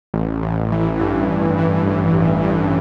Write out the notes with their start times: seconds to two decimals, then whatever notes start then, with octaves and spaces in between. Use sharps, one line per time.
0.14 A1
0.42 A1
0.72 E3
1.00 G2
1.28 A1
1.58 E3
1.86 A1
2.15 A1
2.43 G2